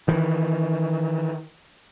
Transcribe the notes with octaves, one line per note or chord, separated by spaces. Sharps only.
D#3 E3